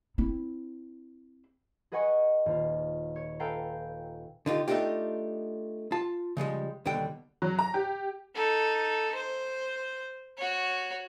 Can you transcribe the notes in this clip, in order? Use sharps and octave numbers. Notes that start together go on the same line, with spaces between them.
C4 E4
G#4 B4 D#5 F#5 G#5 C#6
D#1 F4
C#5
A4 B4 F5 G5 G#5 A#5
D3 D#4 F4 G4
A3 D4 D#4 F4 G4
F4 A5
C#3 F3 G3 G#3
D#2 B2 D3 G3 G5
F#3
A#5
G4
D#4 A4
C5
F#4 C#5